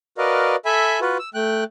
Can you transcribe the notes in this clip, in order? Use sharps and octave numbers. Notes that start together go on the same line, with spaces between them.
F#4 A#4 B4 D5 D#5 F5
A4 E5 G#5 B5
F4 F#4 B4
E6
A3 G5 F#6